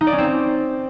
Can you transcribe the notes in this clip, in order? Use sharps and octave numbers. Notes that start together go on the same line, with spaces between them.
D#4
D5
C#4
C4